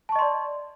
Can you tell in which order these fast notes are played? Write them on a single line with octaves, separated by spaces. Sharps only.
A5 C#6 D#5 C6 D5